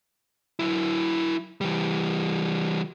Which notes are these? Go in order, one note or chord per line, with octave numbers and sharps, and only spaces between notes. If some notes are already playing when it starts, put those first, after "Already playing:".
F#3 E4
E3 G3